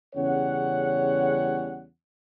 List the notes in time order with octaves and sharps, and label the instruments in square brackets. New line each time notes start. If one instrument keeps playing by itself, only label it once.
[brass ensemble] E2 C#3 G3 C#4 C#5 F#5